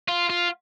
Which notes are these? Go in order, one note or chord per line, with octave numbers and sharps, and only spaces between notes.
F4
F4